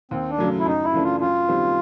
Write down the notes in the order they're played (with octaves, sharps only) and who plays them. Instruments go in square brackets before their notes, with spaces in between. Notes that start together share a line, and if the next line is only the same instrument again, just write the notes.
[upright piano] D#2 [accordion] C4
[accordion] D4
[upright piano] C#3 F#3 A3
[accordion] E4
[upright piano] F#2 [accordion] D#4
[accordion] E4
[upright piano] C#3 E3 A3 D4
[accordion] F4
[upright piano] F#2 [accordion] F4
[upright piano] D#3 G3 C4